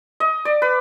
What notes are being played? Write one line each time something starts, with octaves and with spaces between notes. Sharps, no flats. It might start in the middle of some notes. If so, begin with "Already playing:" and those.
D#5
D5
B4